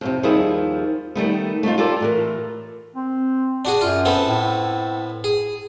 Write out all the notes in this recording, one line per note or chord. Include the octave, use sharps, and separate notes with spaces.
F2 A2 C3
D#2 D#3 F3 G3 E4 G#4
D#3 G3 A3 B3
A3 B3 D#4 F4
F4 G4 A4 A#4 D5
A2 E3 A#4
C4
D4 F#4 G#4
F#2 F4
B3 C4 A4
A2
G#4